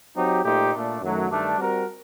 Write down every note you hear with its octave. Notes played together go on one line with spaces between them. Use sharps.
F#3 C4 D#4 G4
A#2 A3 D#4 G4 C5
A#2 A3 D4
F#2 D#3 F#3 A3
G2 D#3 A3 D4
G3 C4 F#4 A#4